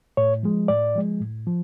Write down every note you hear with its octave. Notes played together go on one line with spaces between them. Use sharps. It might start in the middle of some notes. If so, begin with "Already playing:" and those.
A2 C#5
F3 G#3
A2 D5
F3 G#3
A2
F3